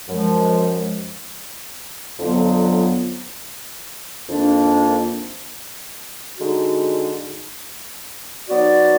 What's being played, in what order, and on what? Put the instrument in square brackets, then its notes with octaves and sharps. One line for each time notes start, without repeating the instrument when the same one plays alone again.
[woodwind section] F#2 F3 G#3
F2 D3 F#3 B3 F4
F2 D#3 A#3 D4
D3 G#3 D#4 F#4
F#3 B3 D#4 F#4 D5